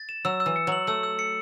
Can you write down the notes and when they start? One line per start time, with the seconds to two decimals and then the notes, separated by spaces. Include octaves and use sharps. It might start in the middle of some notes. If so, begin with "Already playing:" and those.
Already playing: A6
0.09 E7
0.25 F#3 E6
0.40 E6
0.46 E3
0.56 C#7
0.67 F#3 F#7
0.87 A3 E6
1.03 E6
1.19 C#7